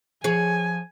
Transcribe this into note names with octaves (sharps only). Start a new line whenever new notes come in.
F3 G#4 C#5 G#5